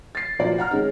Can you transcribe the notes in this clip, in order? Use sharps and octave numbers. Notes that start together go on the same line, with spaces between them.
A6 C7
F1 A#2 F#3 D5
F#5 A#5 F6
D#3 G#3 C#4 D#4